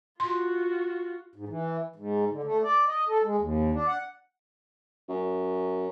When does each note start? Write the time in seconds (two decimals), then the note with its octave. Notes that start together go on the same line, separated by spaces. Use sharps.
0.20 F4 F#4 C6
1.35 G#2
1.49 E3
1.96 G#2
2.31 D3
2.44 A3
2.63 D5
2.87 D#5
3.09 A4
3.23 G#3
3.38 D#2
3.73 D4
3.88 F#5
5.09 F#2